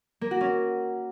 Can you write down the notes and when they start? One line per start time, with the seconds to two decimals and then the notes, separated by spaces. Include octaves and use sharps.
0.21 A#3
0.31 F#4
0.41 C#4